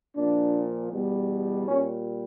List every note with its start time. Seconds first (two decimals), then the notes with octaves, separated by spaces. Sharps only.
0.16 A#2 F3 D4
0.91 E2 B2 G3
1.68 A#2 G3 C#4